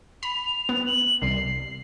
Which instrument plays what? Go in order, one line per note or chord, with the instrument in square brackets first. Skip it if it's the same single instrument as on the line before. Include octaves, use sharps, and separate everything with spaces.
[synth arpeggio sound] B5 [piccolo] F7
[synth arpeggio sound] B3
[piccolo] F#7
[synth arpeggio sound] C2 [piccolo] C7